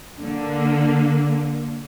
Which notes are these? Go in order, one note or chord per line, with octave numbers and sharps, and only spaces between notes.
D3 A#3